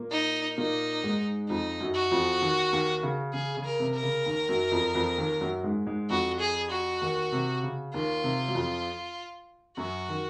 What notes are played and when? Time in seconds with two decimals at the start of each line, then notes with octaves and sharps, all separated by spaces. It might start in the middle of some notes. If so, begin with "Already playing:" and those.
Already playing: A#2 A#3
0.12 D#4
0.58 A#2 A#3 D#4
1.04 G#2 G#3
1.49 F2 F3 D#4
1.80 F#2 F#3
1.95 F#4
2.11 F2 F3
2.42 D#2 D#3
2.73 D#2 D#3
3.03 C#3
3.34 C#3 G#4
3.57 C#3
3.65 A#4
3.80 C3
3.95 A#4
4.03 C#3
4.26 D#2 D#3
4.49 F#2 F#3
4.72 F2 F3
4.95 F2 F3
5.18 D#2 D#3
5.40 F#2 F#3
5.64 G#2 G#3
5.86 G#2 G#3
6.10 F2 F3 F#4
6.40 G#4
6.71 F#4
7.01 D#2 D#3
7.32 C3
7.63 C#3
7.94 D#2 D#3 F4
8.24 C3
8.48 F#3
8.55 F2 F3
9.77 F#2 F#3 F#4
10.08 D#3